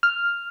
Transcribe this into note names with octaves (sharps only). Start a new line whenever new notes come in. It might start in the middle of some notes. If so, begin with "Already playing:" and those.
F6